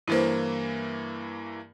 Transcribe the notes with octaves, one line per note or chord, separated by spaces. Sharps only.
G2 E3 A#3 E4 B4 C5